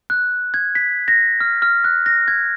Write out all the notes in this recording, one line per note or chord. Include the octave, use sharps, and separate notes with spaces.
F#6
G#6
B6
A#6
F6
F6
F#6
A#6
G#6